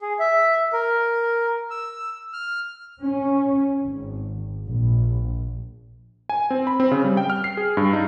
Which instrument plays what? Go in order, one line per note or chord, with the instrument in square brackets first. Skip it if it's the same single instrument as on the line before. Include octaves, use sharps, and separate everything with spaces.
[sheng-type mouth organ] G#4
E5
A#4
E6
F6
[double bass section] C#4
G#1
A#1
[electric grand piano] G#5
C4
B5
C4
C#3
G3
G5
F6
C7
G#4
G2
D#4